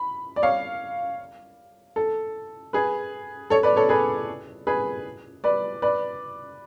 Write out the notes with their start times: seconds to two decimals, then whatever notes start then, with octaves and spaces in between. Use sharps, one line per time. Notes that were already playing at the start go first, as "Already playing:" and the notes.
Already playing: B5
0.36 D5
0.42 C#5 F5
1.96 A4
2.73 G#4 B4
3.50 A4 C#5
3.63 B4 D5
3.76 A4 C#5
3.89 G#4 B4
4.67 G#4 B4
5.44 B4 D5
5.82 B4 D5